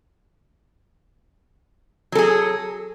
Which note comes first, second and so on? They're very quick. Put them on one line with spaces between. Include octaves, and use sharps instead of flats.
F#3 A4 G#4